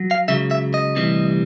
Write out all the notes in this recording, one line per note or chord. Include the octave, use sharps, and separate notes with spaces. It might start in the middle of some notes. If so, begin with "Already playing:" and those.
Already playing: F#3
F5
C#2 C#3 F#3 E5
E5
D#5
D2 C3 E3 G3